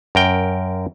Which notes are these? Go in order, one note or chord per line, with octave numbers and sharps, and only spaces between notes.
F#2 A#4 G5